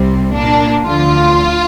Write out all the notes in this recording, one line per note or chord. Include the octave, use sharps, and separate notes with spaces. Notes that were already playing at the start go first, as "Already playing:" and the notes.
Already playing: C2 C3 G3 C4
A#2 A#3 D4
D2 D3 F3 F4